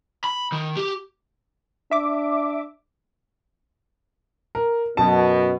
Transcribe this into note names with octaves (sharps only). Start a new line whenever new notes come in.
B5
D#3
G4
D4 E5 D6
A#4
F#2 B2 A5